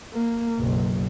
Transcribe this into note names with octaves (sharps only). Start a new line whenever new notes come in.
A#3
F#1 B1